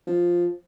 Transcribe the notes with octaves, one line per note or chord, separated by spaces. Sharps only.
F3